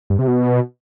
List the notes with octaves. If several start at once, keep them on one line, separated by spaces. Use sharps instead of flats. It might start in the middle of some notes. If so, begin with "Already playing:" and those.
G2
C3
B2